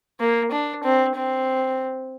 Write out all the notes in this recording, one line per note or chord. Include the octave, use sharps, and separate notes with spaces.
A#3
D4
C4
C4